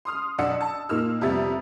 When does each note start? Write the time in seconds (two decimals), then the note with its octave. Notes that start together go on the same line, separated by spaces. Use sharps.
0.05 C6 D#6 F6
0.38 B1 D4 D5 F#5 E6 C#7
0.61 A5
0.89 A#2 A#3 D#4 E6 F6
1.21 F2 C3 G3 B3 E5 A6